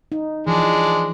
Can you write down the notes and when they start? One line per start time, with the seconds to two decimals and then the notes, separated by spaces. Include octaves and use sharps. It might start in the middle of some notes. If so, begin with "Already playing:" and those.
0.12 D#4
0.47 E3 F3 G#3 D4